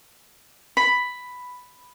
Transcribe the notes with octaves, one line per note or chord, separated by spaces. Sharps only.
B5